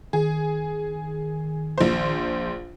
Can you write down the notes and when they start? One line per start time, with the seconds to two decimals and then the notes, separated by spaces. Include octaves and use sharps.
0.13 D#3 G#4
1.78 A#1 C5